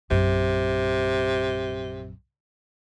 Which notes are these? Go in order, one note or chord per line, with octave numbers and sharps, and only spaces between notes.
A#1 F#2 C3